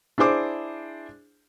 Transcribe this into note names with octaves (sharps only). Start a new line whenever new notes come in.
D4 E4 G#4 C5 D6